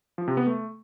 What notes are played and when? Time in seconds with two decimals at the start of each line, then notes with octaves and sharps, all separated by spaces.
0.18 F3
0.28 C3
0.37 B3
0.47 A3